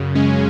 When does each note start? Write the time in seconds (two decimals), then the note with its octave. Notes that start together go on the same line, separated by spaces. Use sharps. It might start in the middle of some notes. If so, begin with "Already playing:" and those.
Already playing: F#2 C#3
0.15 G#3 C#4